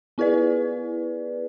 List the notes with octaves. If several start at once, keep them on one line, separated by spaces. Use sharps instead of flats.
B3 E4 G#4 B4 D5